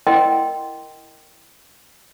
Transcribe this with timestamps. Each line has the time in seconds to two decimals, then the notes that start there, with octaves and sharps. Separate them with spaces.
0.07 E4 A#4 D#5 F#5 G5 C6